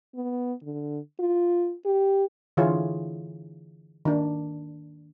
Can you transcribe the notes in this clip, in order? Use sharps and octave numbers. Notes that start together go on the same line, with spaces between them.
B3
D3
F4
G4
D3 E3 E4 F4 G#4 C#5
D#3 D4